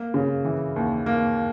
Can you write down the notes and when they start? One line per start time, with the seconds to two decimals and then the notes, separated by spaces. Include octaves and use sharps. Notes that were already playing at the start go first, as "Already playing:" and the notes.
Already playing: A#3
0.14 C#3
0.44 E3
0.76 D#2
1.06 A#3